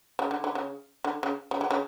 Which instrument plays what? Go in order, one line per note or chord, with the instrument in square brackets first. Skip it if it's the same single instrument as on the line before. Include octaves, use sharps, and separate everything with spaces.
[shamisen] C#3
D3
D3
C#3
D3
C#3
C#3
D3
C#3